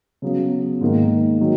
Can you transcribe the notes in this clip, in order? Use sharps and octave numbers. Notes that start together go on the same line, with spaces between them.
C#3 F#3 B3
G#2 D#3 A#3
D#3 F#3